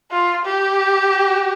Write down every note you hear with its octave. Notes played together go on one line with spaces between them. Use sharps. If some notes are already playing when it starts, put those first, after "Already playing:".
F4
G4